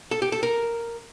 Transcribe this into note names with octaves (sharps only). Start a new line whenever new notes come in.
A4
G4
A4
A#4